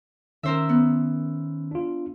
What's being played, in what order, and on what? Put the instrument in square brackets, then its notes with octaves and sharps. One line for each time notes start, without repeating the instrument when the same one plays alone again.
[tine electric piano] D#3 C#4 [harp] A#4 C5 E5
[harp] B3
[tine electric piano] D4 F4